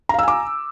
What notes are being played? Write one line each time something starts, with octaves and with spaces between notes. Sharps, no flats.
F5 G#5 A#5 D6 E6